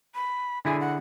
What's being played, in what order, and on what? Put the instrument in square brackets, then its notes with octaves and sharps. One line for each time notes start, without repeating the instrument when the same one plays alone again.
[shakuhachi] B5
[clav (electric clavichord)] D3 E4 G#4 [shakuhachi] G#5
[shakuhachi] F#5